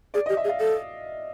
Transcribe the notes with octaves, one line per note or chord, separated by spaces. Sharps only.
G#4 D5
D#5
G4
E5
G#4
F5
A4